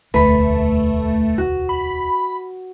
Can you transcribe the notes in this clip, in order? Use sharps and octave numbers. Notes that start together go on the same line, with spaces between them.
E1 D2 A3 B4 B5
F#4
B5